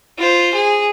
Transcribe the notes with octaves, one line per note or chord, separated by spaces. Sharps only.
F4 C5
G#4